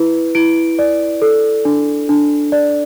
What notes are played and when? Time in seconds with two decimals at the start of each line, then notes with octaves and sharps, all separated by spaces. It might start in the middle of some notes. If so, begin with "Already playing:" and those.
Already playing: E4 B4
0.35 E4 D7
0.79 D5
1.22 A4
1.65 D4
2.09 D4
2.52 D5